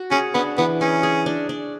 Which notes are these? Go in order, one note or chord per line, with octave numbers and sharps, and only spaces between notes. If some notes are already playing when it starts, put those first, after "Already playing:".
Already playing: F#4
C#4 G#4
B3 D4
E3 B3
C#4 G#4
G#4
D4
D4